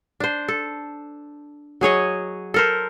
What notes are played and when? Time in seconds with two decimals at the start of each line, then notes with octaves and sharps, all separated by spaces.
0.20 D4 C5
0.48 A4
1.81 F#3 G#4 C#5 D#5
2.54 A4 A#4 C5